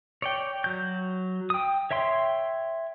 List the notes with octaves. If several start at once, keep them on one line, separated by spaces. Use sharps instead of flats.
C#5 D5 G5
F#3 G6
G5 D#6
C#5 E5 G5 C6